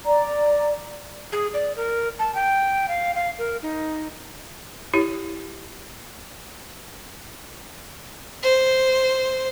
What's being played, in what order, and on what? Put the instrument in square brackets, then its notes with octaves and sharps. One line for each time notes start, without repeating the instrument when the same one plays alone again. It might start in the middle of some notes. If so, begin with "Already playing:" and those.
[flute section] D5 A#5
[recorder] G#4
D5
A#4
A5
G5
F5
F5
A#4
D#4
[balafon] E4 G4 C#5
[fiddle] C5